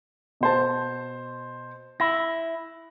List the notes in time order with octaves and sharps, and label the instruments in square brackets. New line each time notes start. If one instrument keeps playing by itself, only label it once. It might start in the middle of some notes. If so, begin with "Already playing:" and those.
[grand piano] B2 C5 A5
[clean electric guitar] E4 [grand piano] A#6